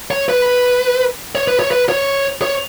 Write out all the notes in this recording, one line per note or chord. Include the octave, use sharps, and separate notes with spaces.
C#5
B4
C#5
B4
C#5
B4
C#5
C#5